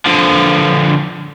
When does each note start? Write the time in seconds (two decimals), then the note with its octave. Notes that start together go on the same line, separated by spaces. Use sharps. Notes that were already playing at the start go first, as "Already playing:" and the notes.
0.06 D3 F3